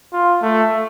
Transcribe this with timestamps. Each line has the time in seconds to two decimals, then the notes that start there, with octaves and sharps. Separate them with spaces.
0.13 F4
0.42 A3